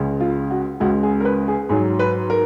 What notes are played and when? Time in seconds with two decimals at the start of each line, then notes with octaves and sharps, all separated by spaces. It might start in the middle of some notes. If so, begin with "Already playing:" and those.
Already playing: C#2 C#3 G#3
0.20 F4
0.50 F#4
0.80 C#2 C#3 G#3 F#4
1.03 G#4
1.20 A#4
1.25 B4
1.48 G#4
1.69 G#2 F#3 G#4
1.99 B4
2.30 A#4